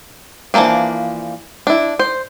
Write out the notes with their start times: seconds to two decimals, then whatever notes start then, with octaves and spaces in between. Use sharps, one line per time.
0.54 E3 F3 G3 A#3 D4
1.67 D4 E4
1.99 C5